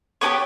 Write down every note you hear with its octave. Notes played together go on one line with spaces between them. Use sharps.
B3 D4 G4 C#5